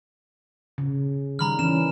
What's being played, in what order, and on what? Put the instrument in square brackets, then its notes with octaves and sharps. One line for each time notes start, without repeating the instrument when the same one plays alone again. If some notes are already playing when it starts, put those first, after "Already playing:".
[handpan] C#3
[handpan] D#3 G3 [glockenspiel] A#5 B5 F6
[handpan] E3 C#4 [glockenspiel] E7